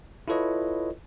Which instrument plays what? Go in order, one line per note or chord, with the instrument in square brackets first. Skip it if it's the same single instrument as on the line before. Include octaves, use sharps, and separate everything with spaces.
[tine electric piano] E4 F4 A4 B4 C#5 D#5